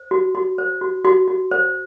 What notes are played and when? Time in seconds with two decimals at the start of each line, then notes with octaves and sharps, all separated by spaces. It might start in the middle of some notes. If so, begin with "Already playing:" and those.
Already playing: C5
0.11 F#4
0.35 F#4
0.58 C5
0.81 F#4
1.05 F#4
1.28 F#4
1.51 C5